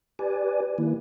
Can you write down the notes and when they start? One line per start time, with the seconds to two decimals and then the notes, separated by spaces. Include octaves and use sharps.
0.19 G4 B4 D5 G#5
0.78 D#3 A#3 E4